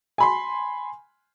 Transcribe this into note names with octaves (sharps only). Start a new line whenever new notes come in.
G#5 B5 C6